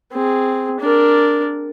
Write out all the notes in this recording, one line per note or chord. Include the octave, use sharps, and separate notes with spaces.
C4 G#4
D4 A#4